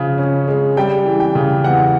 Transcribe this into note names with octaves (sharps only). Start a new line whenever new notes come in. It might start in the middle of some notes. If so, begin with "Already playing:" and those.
Already playing: C#3 F3 G#3 C#4
C#4
G#3
G3 G5
E3
G5
C#3
E2 F#5